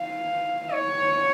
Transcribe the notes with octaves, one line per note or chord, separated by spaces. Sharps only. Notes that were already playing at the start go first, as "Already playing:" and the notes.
Already playing: F5
C#5